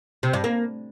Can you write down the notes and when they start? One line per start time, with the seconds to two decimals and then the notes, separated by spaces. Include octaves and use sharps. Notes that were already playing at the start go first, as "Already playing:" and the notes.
0.23 C3
0.33 G2
0.44 A#3